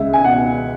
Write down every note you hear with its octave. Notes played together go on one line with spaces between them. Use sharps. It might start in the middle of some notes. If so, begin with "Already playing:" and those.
Already playing: C#2 E5
G#5
B2 F#5